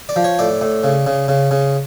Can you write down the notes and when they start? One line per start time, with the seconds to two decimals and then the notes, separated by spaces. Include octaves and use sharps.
0.09 D5
0.16 F3
0.24 C#5
0.39 A2 D5
0.61 A2
0.84 C#3
1.06 C#3
1.28 C#3
1.51 C#3